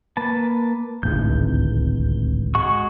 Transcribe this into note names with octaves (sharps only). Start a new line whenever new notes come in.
A#3 B4 A5
D1 G#1 C#2 G6
G#3 F#4 C#6